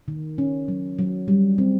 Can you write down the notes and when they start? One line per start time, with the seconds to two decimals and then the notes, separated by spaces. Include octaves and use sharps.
0.08 D#3
0.38 C#4
0.68 F#3
0.99 F#3
1.28 G3
1.58 C4